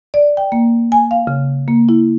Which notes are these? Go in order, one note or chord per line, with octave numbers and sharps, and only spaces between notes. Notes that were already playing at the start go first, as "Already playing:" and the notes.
D5
G5
A#3
G#5
F5
C#3
A#3
E4